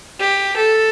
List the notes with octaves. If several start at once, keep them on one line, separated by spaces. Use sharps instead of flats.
G4
A4